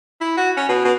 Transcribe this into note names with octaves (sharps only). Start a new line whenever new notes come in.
E4
F#4
C#4
B2
B2